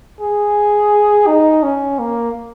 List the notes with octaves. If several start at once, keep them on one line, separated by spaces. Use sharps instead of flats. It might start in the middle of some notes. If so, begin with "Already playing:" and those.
G#4
D#4
C#4
A#3